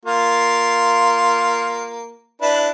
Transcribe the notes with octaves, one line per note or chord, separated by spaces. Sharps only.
A#3 F4
D4 E4 B4